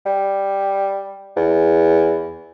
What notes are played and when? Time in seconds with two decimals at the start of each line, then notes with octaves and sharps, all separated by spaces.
0.06 G3
1.36 E2